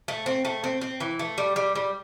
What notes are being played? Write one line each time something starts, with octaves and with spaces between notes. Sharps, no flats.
A3
C4
A3
C4
C4
E3
A3
G3
G3
G3